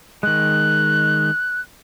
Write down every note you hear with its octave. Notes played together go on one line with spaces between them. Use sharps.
D#3 G#3 F#6